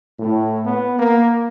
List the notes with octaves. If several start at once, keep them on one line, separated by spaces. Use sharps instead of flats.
A2
B3
A#3